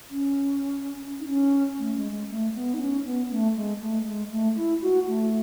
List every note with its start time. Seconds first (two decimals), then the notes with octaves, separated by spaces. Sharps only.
0.10 C#4
1.20 D#4
1.27 C#4
1.78 A3
1.96 G#3
2.12 G#3
2.29 A3
2.54 B3
2.74 D#4
2.80 C#4
3.05 B3
3.30 A3
3.56 G#3
3.80 A3
4.06 G#3
4.31 A3
4.56 E4
4.82 F#4
5.07 A3